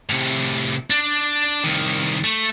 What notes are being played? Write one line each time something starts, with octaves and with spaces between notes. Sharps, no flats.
A2 C3
D4
C2 D#3
A3